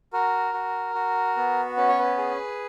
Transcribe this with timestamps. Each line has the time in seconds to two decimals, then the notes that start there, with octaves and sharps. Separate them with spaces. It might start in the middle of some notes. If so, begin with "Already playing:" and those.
0.13 F#4 A#4
0.54 F#4
0.95 F#4
1.37 B3
1.77 C#4 B4
1.88 C#5
1.99 B4
2.18 G#4